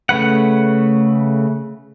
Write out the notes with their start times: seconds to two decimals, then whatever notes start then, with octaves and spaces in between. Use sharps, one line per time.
0.09 C#3 A3 B4 F#5